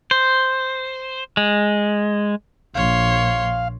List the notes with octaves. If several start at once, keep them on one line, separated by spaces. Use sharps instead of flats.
C5
G#3
A#1 C#5 F5 C6